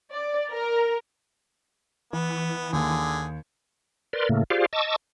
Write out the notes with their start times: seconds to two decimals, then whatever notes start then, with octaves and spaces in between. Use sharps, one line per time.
0.11 D5
0.50 A#4
2.13 E3 B3
2.73 D#2 D3 G#4
4.13 A#4 B4 D5 C6
4.29 A2 C#3 A3 A#3
4.50 F4 G4 G#4 C5 D5 F5
4.73 D#5 A5 C#6 D6 E6